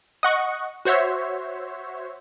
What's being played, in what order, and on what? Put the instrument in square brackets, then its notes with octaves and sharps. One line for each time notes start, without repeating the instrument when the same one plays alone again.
[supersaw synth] D#5 F#5 C#6
F#4 C5 C#5 E5